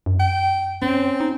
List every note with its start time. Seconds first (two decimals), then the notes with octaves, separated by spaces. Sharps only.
0.06 F#2
0.19 G5
0.82 C4 C#4
1.20 D#4